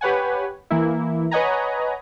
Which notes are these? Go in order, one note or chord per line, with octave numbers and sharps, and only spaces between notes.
G4 B4 C#5 F#5 G#5
E3 A#3 E4
B4 C#5 D#5 F#5 G#5 A#5